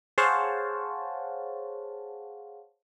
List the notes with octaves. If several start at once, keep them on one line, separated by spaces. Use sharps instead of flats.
G#4 C5 C#5 F5 F#5 A5